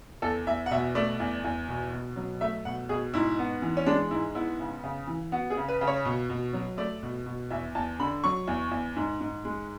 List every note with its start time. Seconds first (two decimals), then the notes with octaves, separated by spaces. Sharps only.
0.22 E2 A4
0.47 E2 E5
0.66 F#5
0.71 B2 E5
0.95 A3 D5
1.20 E2
1.44 E2
1.68 B2
1.92 B2
2.16 F#3
2.41 A3 E5
2.65 B2 F#5
2.89 B2 G#4
3.14 G#2 E4
3.39 B3
3.62 E3
3.77 C#4
3.86 G#3 D4
4.11 G#2 E4
4.35 B3 E4
4.60 C#3
4.84 C#3
5.07 E3
5.32 B3 F#4
5.50 G#4
5.57 C#3
5.68 B4
5.81 C#3
5.87 C#5
6.05 B2
6.29 B2
6.53 F#3
6.77 A3 D5
7.03 B2
7.26 B2
7.51 E2 E5
7.75 E2 A5
7.99 D3 B5
8.24 F#3 C#6
8.48 E2
8.71 E2
8.96 G#2
9.20 G#2
9.45 G#3